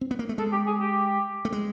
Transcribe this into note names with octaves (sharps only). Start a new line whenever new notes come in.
C4
B3
A#3
A3
G#3 A4
G4
G#4
G4
A3
G#3